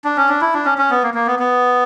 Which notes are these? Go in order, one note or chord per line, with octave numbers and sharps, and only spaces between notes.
D4
C#4
D4
E4
D4
C#4
C#4
B3
A#3
A#3
B3
B3